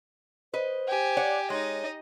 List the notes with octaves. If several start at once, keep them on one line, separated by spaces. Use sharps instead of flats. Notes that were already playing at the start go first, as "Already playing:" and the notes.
B4 C5 D#5
G4 G#5
C#5 D5 F#5
G#3 D#4 C#5 D#5